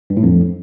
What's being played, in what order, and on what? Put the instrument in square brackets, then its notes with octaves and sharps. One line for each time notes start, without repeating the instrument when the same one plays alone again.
[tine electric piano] G2
A2
F2